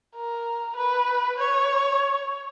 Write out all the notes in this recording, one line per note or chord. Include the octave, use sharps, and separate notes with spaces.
A#4
B4
C#5